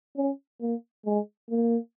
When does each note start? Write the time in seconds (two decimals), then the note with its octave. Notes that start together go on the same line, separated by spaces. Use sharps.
0.17 C#4
0.61 A#3
1.06 G#3
1.50 A#3